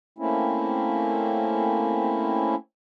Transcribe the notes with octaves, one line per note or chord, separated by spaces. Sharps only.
A3 A#3 C4 C#4 E4